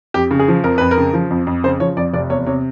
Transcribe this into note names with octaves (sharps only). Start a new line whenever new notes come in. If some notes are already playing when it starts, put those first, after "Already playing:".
F2 G4
C#3
G#4
F3
F2 A#4
F2 B4
A#4
C#3
F3
F2
F2
C#3 C5
F3 C#5
F2 D5
F1 D5
E2 C#5
C3 C#5